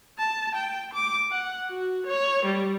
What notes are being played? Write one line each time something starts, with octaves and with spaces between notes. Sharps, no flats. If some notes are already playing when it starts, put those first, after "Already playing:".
A5
G5
D6
F#5
F#4
C#5
G3